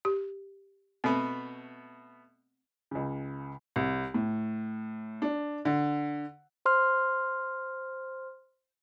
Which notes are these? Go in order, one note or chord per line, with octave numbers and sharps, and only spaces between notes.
G4
B2 A3 B3 C4
C#2 C#3
C2
A2
D4
D3
C5 C6 F6